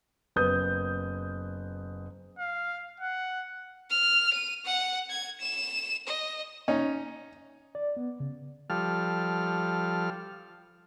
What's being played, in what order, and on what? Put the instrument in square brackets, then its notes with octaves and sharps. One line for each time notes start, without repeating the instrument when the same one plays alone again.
[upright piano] F#1 B3 D#6 G6
[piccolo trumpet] F5
F#5
[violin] F6
D#7
F#5
G#6
E7
D#5
[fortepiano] C#4 D#4
[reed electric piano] D5
B3
C#3
[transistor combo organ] F3 G3 A4 F6